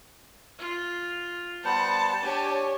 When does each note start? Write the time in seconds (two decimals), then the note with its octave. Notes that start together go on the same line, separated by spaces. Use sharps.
0.59 F4
1.64 G3 B3 C5 F#5 A5
2.23 D4 G4 C#5 G#5